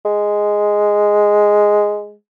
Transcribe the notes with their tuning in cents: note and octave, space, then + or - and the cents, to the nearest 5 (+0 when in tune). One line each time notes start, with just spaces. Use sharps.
G#3 +0